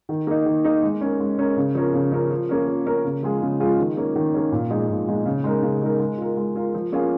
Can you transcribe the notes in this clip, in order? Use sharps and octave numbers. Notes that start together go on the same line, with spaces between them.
D#3
A#3 D#4
D#3
A#3 D#4
G#3
C#4 A#4
G#3
C#4 A#4
C#3
F3 C#4 A#4
C#3
F3 C#4 A#4
F3
A#3 C#4 A#4
F3
A#3 C#4 A#4
C#3
F3 G#3 F4 G#4
C#3
F3 G#3 F4 G#4
D#3
A#3 C#4
D#3
A#3 C#4
A#2
F3 G#3 D#4 G#4
A#2
F3 G#3 D#4 G#4
C#3
G#3 D#4 A#4
C#3
G#3 D#4 A#4
G#3
F4 A#4
G#3
F4 A#4
F3
A#3 C#4 F4 G#4